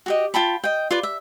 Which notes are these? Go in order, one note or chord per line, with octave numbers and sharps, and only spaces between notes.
F#4 G4 D#5
F4 G5 A5 B5
D#5 G5
F4 B4 D5
E5